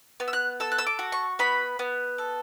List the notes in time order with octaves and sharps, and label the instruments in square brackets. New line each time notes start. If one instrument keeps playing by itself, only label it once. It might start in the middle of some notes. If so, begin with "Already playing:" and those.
[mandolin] B3
E6
F#6
A4 E6
F#6
E6
D6
F#4
C#6
B3 B5
B3
A4